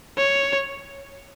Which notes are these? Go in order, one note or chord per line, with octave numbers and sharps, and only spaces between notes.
C#5